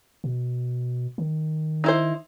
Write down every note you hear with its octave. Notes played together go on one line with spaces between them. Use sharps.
B2
D#3
D#4 E4 C5